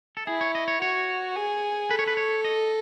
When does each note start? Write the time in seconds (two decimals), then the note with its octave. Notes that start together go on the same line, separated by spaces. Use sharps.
0.17 A4
0.27 E4 G#4
0.41 C#5
0.55 D#5
0.68 C#5
0.81 F#4 C#5
1.36 G#4
1.90 A4 B4
1.99 C#5
2.07 B4
2.17 C#5
2.45 D#5